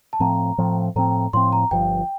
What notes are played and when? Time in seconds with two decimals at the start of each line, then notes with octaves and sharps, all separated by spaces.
0.13 A5
0.20 A2 F3 C4 A#5
0.58 A2 F3 C4
0.96 A2 F3 C4 A#5
1.33 A2 F3 C4 C6
1.52 A#5
1.71 G1 G2 F3 G5